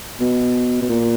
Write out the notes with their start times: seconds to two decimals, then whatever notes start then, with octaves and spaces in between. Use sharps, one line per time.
0.21 B2
0.82 B2
0.89 A#2